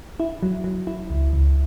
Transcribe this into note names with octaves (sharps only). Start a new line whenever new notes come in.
E4
F#3
F#3
E4
C#2
C#2